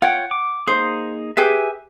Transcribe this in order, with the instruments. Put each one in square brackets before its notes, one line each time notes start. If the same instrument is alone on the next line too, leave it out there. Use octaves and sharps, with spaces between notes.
[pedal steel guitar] F4 C#5 G5 [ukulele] F#5
[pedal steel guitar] D6
[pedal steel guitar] A#3 D#4 G#4 [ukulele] C5
[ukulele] G4 G#4 B4 [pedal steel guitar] E5 G#5